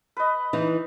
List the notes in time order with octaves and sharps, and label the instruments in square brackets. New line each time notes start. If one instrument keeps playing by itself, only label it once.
[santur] B4 D#5
[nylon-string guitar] E3 D#4